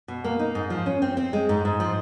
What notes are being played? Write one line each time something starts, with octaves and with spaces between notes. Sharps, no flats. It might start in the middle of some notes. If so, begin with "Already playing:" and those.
B2
A#3
D#4
G#2
F3
C#4
C4
C4
G#3
G#2
G#2
F3